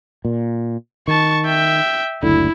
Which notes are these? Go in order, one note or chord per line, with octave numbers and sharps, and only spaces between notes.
A#2
D#3 A5 C#6
E5 G5
F#1 D2 D3 E4